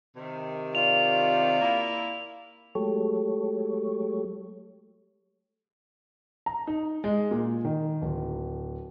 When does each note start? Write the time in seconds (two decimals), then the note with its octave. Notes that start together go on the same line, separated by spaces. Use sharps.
0.16 C3 D#3
0.75 F4 D5 F7
1.61 A#3 E4
2.75 F#3 G#3 A3 G4 A4 C#5
6.46 A#5
6.67 D#4
7.04 G#3
7.31 A#2
7.65 D#3
8.02 D1